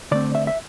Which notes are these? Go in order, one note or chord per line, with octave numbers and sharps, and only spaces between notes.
D3 A3 C4 D5
E5
E5